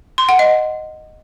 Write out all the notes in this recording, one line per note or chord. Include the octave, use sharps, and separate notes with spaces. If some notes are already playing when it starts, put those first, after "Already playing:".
C6
F#5
D#5